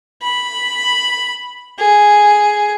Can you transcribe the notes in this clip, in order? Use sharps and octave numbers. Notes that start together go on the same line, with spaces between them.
B5
G#4